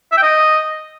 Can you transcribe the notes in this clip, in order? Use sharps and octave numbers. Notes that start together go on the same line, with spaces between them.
E5
G5
D#5